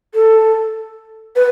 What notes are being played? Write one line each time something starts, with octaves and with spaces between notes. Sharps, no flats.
A4
B4